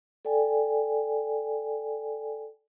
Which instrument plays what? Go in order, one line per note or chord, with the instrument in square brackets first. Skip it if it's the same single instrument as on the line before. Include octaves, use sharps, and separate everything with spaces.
[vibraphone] A4 D5 G5 G#5